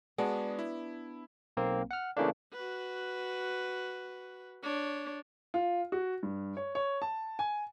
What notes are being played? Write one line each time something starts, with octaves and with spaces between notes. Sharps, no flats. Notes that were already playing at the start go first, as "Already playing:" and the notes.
G#3 B3 D4 F#4 G#4
E4
B1 A#3 C4
F#5 F6
C#3 E3 A3 A#3 D4
F#4 B4
D4 C#5
F4
F#4
G2
C#5
C#5
A5
G#5